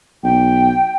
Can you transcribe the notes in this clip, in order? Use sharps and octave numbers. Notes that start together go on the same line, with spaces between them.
B1 G5